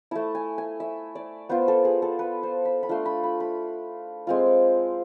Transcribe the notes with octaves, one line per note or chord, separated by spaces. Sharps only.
A3 E4 A5
G#5
G#5
E5
D5
B3 F4 C5
A4
G#4
A4
B4
C5
B5
B5
A3 D4 F4 C6
B5
B5
B5
G#3 C4 F4